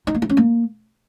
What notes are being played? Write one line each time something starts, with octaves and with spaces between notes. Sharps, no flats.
D#4
A#3
E4
C#4
A#3